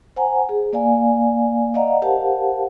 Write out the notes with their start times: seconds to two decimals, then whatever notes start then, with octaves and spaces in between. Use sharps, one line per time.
0.16 C5 F#5 G#5 A#5
0.49 G#4
0.73 A#3 D5 F5 G#5
1.74 D5 D#5 F5 F#5 A#5
2.02 G4 A#4 C5 F5 F#5 A5